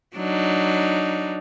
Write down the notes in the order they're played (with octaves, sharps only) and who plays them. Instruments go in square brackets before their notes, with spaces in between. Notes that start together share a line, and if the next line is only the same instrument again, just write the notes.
[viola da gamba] F#3 D4 D#4